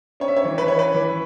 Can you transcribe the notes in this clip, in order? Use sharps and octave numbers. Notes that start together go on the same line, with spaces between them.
C#4 C#5
E5
C#5
E3
B4
C#4 C#5
B4
E3